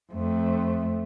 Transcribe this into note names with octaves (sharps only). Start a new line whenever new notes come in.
F2 A3